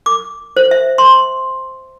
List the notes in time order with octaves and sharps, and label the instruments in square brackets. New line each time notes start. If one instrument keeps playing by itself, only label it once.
[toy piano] D6
C5
E5
C6